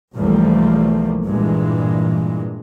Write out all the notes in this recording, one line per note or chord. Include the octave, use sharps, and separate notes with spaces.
B1 E2 F3 G3 A3 A#3
G2 A#2 E3 G#3